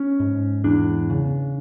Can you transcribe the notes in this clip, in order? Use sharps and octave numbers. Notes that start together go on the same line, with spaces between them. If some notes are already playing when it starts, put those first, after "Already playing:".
Already playing: C#4
G#2
E2 D4
C#3